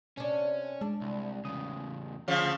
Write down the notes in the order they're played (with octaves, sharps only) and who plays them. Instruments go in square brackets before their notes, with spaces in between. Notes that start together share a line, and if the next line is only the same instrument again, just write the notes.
[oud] C3 D4 [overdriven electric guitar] C#4
[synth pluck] G#3 [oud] D4
[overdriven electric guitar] C2
[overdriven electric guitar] E2 C#3 [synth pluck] D#6
[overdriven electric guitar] D2 [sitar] C#3 F3 [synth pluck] F5